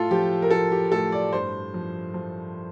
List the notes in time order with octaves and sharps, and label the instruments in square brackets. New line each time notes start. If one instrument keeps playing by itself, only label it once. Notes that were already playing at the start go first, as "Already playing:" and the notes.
Already playing: [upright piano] A2 F4 A4
F3 G4
A#4
F3 A4
G4
A2 A4
D5
G2 C5
F3
F3